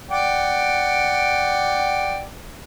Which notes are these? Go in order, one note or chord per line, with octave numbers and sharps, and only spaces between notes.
D5 F#5 G5